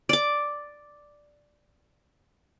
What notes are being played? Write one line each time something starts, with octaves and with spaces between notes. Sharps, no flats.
D5 D6